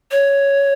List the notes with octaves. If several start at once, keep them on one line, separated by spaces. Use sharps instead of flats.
C#5